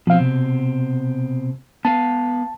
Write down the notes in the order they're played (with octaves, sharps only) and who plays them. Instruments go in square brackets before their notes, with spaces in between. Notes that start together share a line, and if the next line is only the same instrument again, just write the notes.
[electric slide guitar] B2 C4 [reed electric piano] F3 F5
[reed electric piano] C3
[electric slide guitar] B3 B4 F5 [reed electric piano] A5